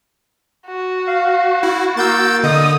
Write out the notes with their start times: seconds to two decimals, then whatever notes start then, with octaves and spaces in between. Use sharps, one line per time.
0.67 F#4
1.07 F5
1.63 E4
1.97 A#3 E6 G6 A6
2.44 D3 D#5 D#6